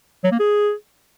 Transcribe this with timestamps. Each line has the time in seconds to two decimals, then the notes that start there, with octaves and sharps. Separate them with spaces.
0.24 F#3
0.32 A#3
0.40 G#4